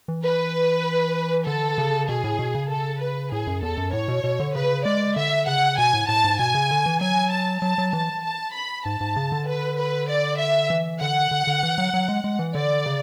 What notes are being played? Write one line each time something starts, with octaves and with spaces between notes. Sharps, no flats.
E3
B4
D3 A4
C#3
B2 G#4
A2
B2
C#3
A4
B4
A2 G#4
F#2
E2 A4
F#2
A2 C#5
B2
B2
D3
C#3 B4
G#3 D5
D3 E5
C#3 F#5
B2 G#5
A2
A2 A5
G#2
B2 G#5
C#3
D3
E3
F#3 G#5
A5
F#3 A5
F#3
E3 A5
A5
B5
G#2 A5
G#2
C#3
D3
B4
B4
D5
E5
E3
D3 F#5
D3
D3
E3
F#3
F#3
G#3
G#3
E3
D3 D5
C#3